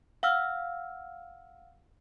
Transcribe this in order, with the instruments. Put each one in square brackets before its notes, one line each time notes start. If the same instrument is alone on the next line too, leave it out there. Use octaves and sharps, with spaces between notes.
[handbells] F5 F#5 E6 F6